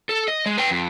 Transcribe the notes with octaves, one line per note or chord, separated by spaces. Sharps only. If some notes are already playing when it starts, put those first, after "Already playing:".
A4
D#5
G#3
B4 G5
F2